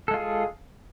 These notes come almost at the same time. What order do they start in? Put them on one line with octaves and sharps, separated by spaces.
A4 G#3 F4 G#4